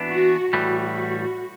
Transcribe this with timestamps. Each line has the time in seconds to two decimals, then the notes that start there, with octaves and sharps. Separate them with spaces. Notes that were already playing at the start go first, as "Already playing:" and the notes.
Already playing: E3 B3 D4
0.09 F#4
0.53 A2 E3 G3 F#4